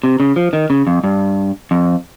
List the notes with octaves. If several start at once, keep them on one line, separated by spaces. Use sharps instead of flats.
C3
C#3
F3
D#3
C#3
F2
G2
F2